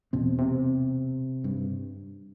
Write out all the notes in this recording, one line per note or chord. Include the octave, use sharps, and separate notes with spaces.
E2 B2 C4
C3
G2